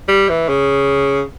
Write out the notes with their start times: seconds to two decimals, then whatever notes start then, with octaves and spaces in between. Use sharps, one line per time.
0.08 G3
0.29 E3
0.49 C#3